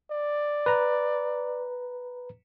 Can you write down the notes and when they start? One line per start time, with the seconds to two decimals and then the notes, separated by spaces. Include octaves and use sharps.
0.11 D5
0.66 B4 A#5